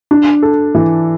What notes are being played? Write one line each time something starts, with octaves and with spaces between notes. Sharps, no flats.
D4
A4
E3